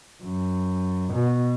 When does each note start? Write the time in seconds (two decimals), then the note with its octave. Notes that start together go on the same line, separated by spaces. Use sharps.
0.23 F#2
1.13 B2